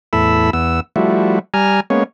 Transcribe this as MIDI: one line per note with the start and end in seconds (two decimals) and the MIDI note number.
0.13 0.50 40
0.13 0.50 45
0.13 0.50 64
0.13 0.50 69
0.13 0.50 83
0.13 0.50 88
0.53 0.80 40
0.53 0.80 59
0.53 0.80 88
0.96 1.39 53
0.96 1.39 55
0.96 1.39 57
0.96 1.39 64
0.96 1.39 66
1.54 1.80 55
1.54 1.80 80
1.54 1.80 82
1.54 1.80 89
1.90 2.04 56
1.90 2.04 58
1.90 2.04 59
1.90 2.04 61
1.90 2.04 73